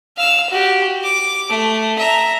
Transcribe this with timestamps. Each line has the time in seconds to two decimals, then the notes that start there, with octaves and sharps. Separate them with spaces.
0.17 F5 E6
0.50 F#4 G4
1.04 D6
1.50 A3
1.98 E5 A#5